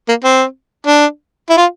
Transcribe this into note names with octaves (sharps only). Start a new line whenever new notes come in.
A#3
C4
D4
E4
F4